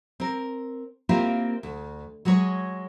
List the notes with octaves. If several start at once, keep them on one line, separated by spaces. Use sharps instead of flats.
C4 A#4
A#3 C4 E4 F4 G4 A#4
D2
F#3 G#3 G#4 A4 C#5